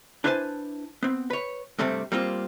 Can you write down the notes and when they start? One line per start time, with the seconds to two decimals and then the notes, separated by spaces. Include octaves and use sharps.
0.24 D4 E4 B4 C5 G#5 A5
1.03 B3 C4
1.30 B4 C#5
1.79 G2 C3 G3 A3 C4
2.12 G3 A#3 C4 F4